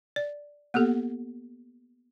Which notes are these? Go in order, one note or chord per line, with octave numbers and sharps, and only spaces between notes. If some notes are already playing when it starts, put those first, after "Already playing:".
D5
A#3 B3 G4 A4